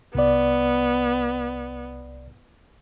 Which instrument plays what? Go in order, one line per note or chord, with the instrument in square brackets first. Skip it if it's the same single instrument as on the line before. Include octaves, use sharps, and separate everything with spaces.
[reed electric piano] C2 D5 [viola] B3